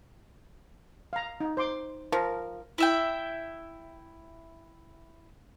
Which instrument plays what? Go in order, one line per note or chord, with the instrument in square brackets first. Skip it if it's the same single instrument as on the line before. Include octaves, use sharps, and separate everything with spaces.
[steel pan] F5 A#5
D#4
C5 C6 D6
[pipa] F3 [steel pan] A#4
[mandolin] E4 E5 G5